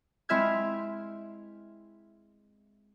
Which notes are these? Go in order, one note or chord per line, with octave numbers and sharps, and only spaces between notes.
G#3 C4 E4 E5 F6 G#6